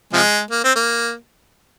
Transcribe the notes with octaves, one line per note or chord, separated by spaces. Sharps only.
C3 F3 G#3
A#3
C4
A#3